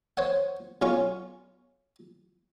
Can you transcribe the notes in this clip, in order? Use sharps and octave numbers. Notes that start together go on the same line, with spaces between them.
C5 C#5 F#5
B1 C#4 F4 C#6